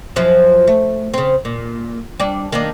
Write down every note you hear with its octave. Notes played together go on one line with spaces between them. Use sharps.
F#2 F3 F#3
A3
C#3 C4
A#2
G3 D4
D#3 A#3 D4